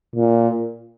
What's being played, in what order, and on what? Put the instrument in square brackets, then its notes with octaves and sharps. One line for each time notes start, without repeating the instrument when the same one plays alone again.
[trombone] A#2